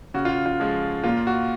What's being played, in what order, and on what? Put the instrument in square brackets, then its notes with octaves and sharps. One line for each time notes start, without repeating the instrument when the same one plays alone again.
[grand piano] C#3 F#4
F4
F4
F3 G#3
A#2 F4
F#4